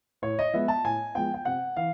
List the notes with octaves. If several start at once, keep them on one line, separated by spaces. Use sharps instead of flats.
A2 C#5
D#5
F3 G#3 B3 E5
A5
A2 G#5
F3 G#3 B3 G5
G5
C3 F#5
E3 F5